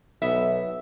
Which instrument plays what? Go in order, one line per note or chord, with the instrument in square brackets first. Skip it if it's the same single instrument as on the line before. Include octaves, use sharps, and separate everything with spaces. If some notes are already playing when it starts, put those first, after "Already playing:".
[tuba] B1 [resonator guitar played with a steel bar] B3 E5